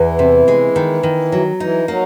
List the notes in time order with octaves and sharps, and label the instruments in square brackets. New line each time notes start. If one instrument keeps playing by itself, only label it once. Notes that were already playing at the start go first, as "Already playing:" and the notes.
Already playing: [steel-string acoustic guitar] E2 [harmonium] E3
[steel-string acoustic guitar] C3
G#3
D#3
D#3
F#3
[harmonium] E3 [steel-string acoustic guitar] D#4
[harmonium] F#3 [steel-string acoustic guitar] A#3